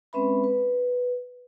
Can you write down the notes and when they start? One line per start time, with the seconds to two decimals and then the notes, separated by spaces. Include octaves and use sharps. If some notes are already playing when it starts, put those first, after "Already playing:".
0.13 G#3 C4 C#4 B4 E5 B5
0.44 B4